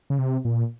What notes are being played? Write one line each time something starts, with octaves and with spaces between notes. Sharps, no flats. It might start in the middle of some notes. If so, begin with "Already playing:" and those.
C#3
C3
A#2